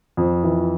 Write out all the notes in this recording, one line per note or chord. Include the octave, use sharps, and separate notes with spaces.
F2
E3